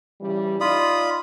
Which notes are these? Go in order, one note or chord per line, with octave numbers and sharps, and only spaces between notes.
C#3 E3 G3
D#4 F4 D5 B5 D#6